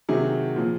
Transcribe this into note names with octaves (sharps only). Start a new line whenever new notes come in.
C3 D#3 F#3 G#4
A#2 F3